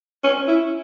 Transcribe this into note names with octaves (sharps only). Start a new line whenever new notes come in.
C#4
E4